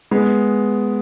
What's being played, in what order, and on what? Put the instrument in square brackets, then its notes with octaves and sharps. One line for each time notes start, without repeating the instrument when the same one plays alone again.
[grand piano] G#3 B3